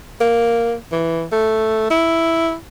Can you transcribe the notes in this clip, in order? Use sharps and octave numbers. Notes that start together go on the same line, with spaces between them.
A#3
E3
A3
E4